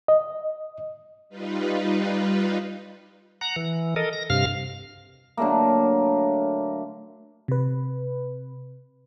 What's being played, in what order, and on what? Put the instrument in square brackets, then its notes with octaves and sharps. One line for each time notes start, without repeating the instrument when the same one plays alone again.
[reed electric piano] D#5
[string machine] G3 D#4 F4 B4
[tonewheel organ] F#5 A#5
E3
A4 A#4 D#5
A#6
G2 C3 F5 F6
[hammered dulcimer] D3 F#3 A3 A#3
[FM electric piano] C3 B4